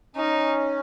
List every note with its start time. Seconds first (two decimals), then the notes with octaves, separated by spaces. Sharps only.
0.16 C#4 D#4